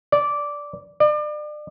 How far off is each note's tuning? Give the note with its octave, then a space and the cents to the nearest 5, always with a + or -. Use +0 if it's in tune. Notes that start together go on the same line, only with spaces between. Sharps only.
D5 -10
D5 +35